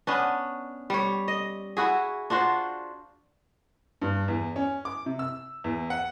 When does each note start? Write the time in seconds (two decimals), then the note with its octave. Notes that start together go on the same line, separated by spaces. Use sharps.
0.07 B3 C#4 D4
0.90 G3 C#5
1.28 D#5
1.77 E4 F#4 G#4
2.30 D4 F4 F#4 C5
4.02 G2
4.28 E2
4.56 C#4
4.85 D6
5.06 C3
5.19 E6
5.64 E2
5.90 F#5